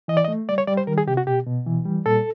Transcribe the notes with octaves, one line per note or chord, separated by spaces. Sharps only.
E3 D#5
D5
D#5
A3
G3 D5
C#5
G3 D5
C5
D#3 A#4
G#4
C3 G4
F#4
B2 G4
B2
E3
G3
A#2 A4